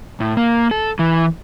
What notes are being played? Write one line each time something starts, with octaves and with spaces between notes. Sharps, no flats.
A2
A#3
A4
E3